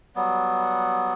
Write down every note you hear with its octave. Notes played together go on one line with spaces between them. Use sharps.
F#3 G3 B3